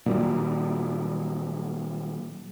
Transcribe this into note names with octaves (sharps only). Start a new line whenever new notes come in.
A#2 D#3 F#3 G3